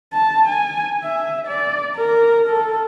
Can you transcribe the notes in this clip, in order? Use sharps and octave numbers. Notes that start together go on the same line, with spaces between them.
A5
G#5
E5
D5
A#4
A4